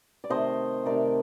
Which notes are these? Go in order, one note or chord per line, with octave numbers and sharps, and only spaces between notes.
D5
C3 D#3 A3 C5 D#5
C3 D#3 A3 A#4 D5